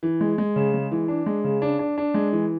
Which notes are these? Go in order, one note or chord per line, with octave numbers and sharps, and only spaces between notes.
E3
G#3
G#3
C#3
G#3
E3
D4
G#3
C#3
D4
D4
D4
G#3
E3